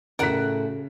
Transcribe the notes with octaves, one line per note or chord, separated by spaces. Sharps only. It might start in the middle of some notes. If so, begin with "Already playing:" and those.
A2 C#3 F#4 A4 A#4 F#5 B6